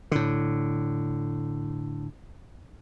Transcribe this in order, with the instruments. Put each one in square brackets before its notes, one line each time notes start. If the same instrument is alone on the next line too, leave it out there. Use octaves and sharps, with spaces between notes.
[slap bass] A2 D3